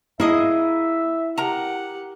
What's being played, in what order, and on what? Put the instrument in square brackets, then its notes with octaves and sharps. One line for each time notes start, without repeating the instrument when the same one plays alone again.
[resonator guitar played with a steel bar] A#3 G#4 D#5 [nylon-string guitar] E4 [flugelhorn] E5
[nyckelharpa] G4 F#5 [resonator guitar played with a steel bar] A#4 A#5